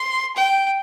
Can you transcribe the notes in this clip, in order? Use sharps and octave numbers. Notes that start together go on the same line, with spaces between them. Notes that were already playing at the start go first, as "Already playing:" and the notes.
Already playing: C6
G5